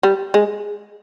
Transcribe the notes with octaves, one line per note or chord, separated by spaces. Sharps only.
G3
G#3